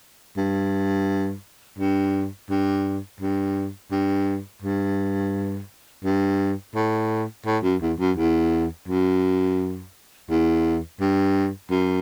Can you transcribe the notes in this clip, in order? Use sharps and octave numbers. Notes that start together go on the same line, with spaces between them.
G2
G2
G2
G2
G2
G2
G2
A2
A2
F#2
E2
F#2
E2
F#2
E2
G2
F#2